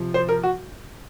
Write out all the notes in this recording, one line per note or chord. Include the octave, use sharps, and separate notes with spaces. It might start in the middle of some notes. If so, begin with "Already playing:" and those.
Already playing: C3 F3
C5
A#4
F#4